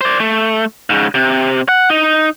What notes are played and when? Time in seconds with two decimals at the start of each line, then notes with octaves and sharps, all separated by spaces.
0.01 C5 D5
0.20 A3
0.90 G#2 C#3
1.14 C3
1.69 F#5
1.90 D#4